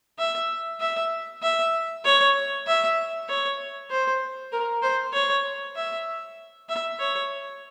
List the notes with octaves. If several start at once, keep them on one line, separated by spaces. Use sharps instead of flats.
E5
E5
E5
C#5
E5
C#5
C5
A#4
C5
C#5
E5
E5
C#5